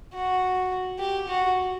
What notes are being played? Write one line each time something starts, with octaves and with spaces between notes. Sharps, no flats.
F#4
G4
F#4